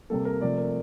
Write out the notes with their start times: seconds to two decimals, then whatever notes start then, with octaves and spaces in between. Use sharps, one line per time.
0.10 C3 G3 A#3 A4
0.25 A#4
0.41 C3 F3 A3 D5
0.58 A#4